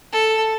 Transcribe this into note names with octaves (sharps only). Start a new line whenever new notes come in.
A4